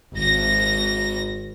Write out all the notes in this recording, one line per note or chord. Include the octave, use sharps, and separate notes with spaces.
G#1 A#6